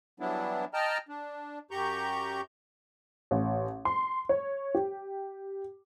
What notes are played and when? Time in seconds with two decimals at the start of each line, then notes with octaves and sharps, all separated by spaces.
0.20 E3 F#3 G3 B3 D4 E4
0.74 D#5 G5 A5 A#5 F6
1.09 D4
1.71 F#2 G4 A#5 C#6 G6
3.31 A1
3.85 C6
4.29 C#5
4.75 G4